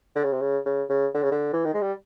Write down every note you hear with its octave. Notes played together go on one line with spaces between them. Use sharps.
D3
C#3
C3
C#3
C#3
C#3
D3
C#3
D3
E3
D#3
G#3
G3